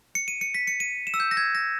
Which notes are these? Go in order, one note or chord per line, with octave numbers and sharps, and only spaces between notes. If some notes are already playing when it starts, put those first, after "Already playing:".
C#7
D#7
C#7
B6
C#7
D#7
E7
E6
G6
A#6
G#6
A#6